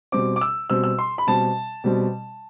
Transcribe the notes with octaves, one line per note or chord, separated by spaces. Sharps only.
B2 G3 C4 D6
D6
E6
B2 G3 C4 E6
E6
C6
B5
B2 G3 C4 A5
B2 G3 C4